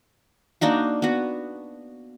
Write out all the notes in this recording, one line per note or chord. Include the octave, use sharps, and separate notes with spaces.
A#3 D4 D#4 F#4
B3 F#4